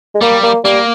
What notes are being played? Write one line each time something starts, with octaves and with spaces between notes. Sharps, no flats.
G#3
G3 A#3
A#3
G3 A#3